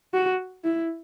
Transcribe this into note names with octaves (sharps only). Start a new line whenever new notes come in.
F#4
E4